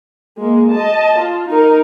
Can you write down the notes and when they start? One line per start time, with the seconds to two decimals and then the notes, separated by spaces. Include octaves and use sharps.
0.37 G#3 A#3
0.71 D#5 A5
1.19 F4
1.49 D#4 A#4